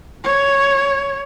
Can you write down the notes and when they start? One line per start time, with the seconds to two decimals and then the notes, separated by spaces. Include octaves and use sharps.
0.24 C#5